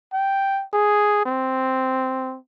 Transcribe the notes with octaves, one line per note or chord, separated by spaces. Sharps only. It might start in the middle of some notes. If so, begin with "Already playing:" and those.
G5
G#4
C4